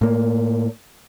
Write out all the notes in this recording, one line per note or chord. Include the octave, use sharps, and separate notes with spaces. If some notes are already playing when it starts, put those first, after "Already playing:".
A2 A#3